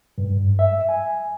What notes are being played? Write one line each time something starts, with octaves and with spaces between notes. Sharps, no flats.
G2
E5
G#5